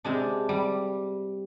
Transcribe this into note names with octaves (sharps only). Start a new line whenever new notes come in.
C3 G#3 D4
G3